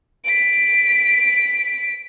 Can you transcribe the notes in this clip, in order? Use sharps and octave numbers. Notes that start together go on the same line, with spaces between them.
B6 D7